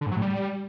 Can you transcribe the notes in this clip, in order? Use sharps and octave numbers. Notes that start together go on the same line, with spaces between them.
D3
G#2
F#3
A2
G3